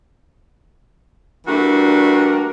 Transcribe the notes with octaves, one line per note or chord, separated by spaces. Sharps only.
E3 G3 A3 A#3 D4 F#4